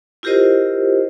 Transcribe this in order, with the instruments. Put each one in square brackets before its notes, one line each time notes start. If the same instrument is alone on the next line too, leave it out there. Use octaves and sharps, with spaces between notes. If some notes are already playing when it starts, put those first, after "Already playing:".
[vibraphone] E4 F4 G4 A#4 C5 D#5